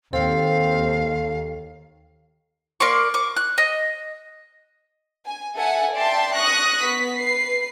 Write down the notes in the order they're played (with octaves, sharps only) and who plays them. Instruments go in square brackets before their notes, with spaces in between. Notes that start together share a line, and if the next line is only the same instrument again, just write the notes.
[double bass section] D#2 [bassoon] C4 [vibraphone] A4 G5 [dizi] F5
[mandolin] A#3 D5 C6 C#6
C#6 D6
F#6
D#5
[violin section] G#5
A4 E5 F#5 G#5
D5 E5 G5 A5 C6
C#6 D#6 F#6 A#6
B3 B6
B4 C7